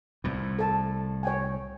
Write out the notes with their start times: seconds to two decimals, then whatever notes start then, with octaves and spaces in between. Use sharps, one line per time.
0.24 C2 A2
0.59 A4 A5
1.23 C#5 G5 G#5